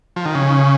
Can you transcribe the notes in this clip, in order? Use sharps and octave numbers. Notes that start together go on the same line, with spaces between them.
F3
D#3
C#3